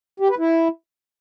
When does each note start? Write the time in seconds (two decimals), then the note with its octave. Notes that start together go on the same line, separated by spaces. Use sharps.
0.20 G4
0.29 B4
0.38 E4